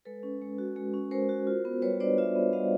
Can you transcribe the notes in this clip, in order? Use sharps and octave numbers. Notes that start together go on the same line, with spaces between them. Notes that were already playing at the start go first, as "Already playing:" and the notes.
G#3 A4 B4
C#4
G#3
F#4
G#3
C#4
G#3 A#4 C5
F#4
F4
B3
G3 B4 C#5
D4 C5 D5
F4 D5 E5
B3
G3 D#5 F5